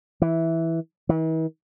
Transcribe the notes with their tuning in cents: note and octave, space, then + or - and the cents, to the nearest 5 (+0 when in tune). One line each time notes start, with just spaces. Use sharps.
E3 -5
E3 -45